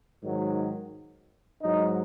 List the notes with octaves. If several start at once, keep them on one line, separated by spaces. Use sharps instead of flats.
G#2 D#3 F#3
G#2 F#3 D#4